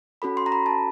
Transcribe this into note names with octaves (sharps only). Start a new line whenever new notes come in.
C#4 F#4 A4 B5
C6
A#5
B5
A5